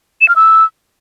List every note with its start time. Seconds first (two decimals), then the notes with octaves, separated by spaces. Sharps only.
0.21 E7
0.29 F6
0.36 E6